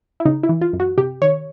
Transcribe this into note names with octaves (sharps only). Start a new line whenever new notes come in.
E4
C#3 D#4
E4
E3
F4
F#2
F#4
C3 G4
D#3 C#5